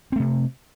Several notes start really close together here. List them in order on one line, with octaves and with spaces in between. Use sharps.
C4 A3 C3